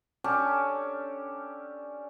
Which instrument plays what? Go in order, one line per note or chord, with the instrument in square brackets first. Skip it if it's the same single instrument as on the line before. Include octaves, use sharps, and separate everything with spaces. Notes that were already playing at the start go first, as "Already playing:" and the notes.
[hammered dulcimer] C#4 D4 G4 A4